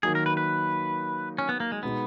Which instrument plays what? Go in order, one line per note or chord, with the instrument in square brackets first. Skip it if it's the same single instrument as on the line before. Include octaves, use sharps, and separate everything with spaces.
[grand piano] D#3 F#3 A#3 D#4 [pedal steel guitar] G#4
[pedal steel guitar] A#4
B4
B4
C#4
B3
A#3
G#3
[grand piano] B2 G#3 D#4 [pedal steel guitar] B3